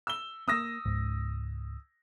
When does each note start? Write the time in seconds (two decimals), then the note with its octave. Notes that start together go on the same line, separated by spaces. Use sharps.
0.07 E6 G7
0.48 A#3 C4 D#6 E6 A#6
0.85 C#2 G#2